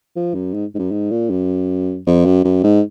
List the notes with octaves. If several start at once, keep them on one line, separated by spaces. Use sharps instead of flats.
F3
F#2
G#2
G#2
F#2
G#2
A#2
F#2
F2
F#2
F#2
G#2